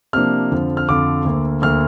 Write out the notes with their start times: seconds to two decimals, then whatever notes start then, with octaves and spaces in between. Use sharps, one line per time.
0.13 C3 F3 A#3 D4 F6
0.51 F2 D3 F3
0.77 F6
0.88 F2 D3 F3 D6
1.25 D2 D3 A#3
1.62 D2 D3 A#3 F6